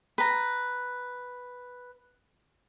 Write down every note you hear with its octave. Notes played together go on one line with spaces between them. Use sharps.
B4 A#5